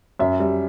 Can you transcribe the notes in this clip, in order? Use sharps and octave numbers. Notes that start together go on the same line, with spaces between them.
F#2 E5
G3